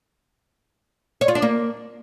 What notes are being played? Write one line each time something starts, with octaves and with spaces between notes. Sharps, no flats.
C#5
F4
D4
A#3